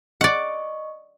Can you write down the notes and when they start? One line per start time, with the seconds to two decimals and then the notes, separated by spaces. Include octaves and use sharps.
0.21 D5 D#5 F#5 C#6